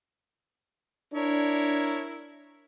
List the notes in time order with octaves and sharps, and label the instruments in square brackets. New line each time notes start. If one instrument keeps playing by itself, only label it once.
[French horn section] D4 [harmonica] E4 A#4 C#5